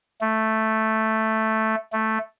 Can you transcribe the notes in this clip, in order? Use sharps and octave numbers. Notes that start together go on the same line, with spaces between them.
A3
A3